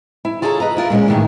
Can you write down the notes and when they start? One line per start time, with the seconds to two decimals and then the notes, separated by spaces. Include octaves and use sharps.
0.25 E4
0.42 F4 G#4 A4 C#5 G5 A#5
0.60 B4 D#5 A#5
0.77 E4 F4 A#4
0.90 A#2 G#3 A#3 C#4
1.08 A2 D#3 E3